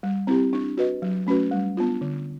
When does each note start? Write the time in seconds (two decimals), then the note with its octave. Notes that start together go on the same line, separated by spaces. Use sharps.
0.03 G3
0.27 C4 E4 G4
0.53 D4
0.77 F#4 B4 D#5
1.02 F#3
1.27 A3 C#4 F#4 B4
1.51 G3
1.77 B3 D4 F4
2.01 D3